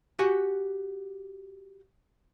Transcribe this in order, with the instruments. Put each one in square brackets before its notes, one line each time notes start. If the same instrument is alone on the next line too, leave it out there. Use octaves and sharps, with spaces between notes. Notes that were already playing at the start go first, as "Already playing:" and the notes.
[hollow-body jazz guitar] F#4 G4 F#5 G#5